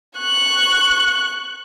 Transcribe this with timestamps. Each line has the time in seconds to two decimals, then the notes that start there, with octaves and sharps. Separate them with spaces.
0.18 C#6 F#6